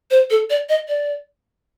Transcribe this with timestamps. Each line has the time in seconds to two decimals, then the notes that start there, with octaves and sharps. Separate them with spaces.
0.11 C5
0.30 A4
0.50 D5
0.69 D#5
0.88 D5